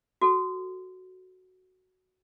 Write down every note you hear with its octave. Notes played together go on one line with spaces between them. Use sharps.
F#4 A4